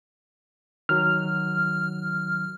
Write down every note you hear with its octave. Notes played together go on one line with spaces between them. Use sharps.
D#3 F#3 F6